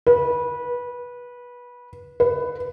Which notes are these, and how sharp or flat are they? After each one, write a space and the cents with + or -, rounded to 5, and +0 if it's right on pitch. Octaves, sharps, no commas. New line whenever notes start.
B4 -20
B4 +10